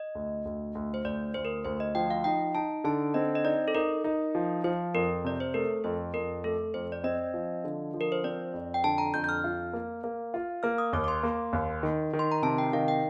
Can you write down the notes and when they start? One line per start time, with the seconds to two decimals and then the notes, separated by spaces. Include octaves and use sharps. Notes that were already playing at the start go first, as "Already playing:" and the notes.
Already playing: D#5
0.15 D2
0.45 D2
0.75 D2
0.94 C5
1.05 D2 D5
1.34 D2 C5
1.45 A#4
1.65 D2 C5
1.80 D#5
1.95 F3 G5
2.10 F5
2.24 D#4 G5
2.55 D#4 A5
2.84 D3 A5
3.14 C4 D#5
3.35 D#5
3.44 D#4 D5
3.68 A4
3.75 D#4 A#4
4.04 D#4
4.35 F3
4.64 F3 C5
4.94 F2 A#4
5.24 C3 D5
5.40 C5
5.54 A3 A#4
5.84 F2 C5
6.14 F2 A#4
6.44 A3 A4
6.74 F2 C5
6.92 D5
7.04 C4 D#5
7.34 F3
7.64 D3
7.94 F3
8.01 A#4
8.12 C5
8.24 C4 D5
8.53 F2
8.74 G5
8.84 D3 A5
8.98 A#5
9.14 F2 G6
9.24 G6
9.29 F6
9.44 F4
9.73 A#3
10.04 A#3
10.34 F4
10.63 A#3 F6
10.78 D#6
10.93 D#2 D6
11.04 D6
11.08 C6
11.23 A#3
11.53 D#2
11.83 D#3
12.13 D#3
12.19 C6
12.32 A#5
12.42 C3 A5
12.58 G5
12.73 D#3 F5
12.88 G5